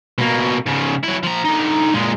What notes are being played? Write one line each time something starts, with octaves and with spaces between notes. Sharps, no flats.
B2 A#3
G#2 C#3
F#3 E4
F3 A#5
D3 D#4
A#2 G#3